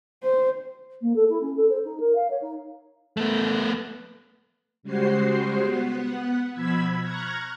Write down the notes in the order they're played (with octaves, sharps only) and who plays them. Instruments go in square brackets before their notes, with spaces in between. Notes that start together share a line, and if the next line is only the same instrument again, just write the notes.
[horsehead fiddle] C5
[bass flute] A#3
A4
E4
C#4
A4
C5
D#4
A#4
F5
C#5
D#4
[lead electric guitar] A3 B3
[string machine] C#3 G3 G#3 F#4 C5 C7
B3 F#5
B2 F3 B5 E6 G#6 B6
A#5 C#6 F6 F#6 G#6 A#6